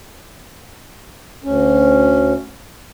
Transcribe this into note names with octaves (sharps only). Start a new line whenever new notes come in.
D2 C#4